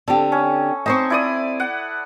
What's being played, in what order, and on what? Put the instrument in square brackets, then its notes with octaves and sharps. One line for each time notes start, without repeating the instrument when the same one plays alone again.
[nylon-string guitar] D3 C4 G4 [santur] A4
[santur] C#4
[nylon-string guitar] C4 C5 E5 [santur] D#4 C#6
[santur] E4 D5 D#6
F#5